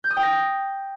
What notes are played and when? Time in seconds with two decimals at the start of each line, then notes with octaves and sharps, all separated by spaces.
0.04 G6
0.10 D#6
0.17 G5
0.23 A#6